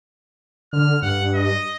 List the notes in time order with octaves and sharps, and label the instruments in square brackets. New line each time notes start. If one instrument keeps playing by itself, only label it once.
[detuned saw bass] D3 [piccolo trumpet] F6
[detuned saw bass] G2 [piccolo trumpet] F#5
[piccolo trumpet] D#5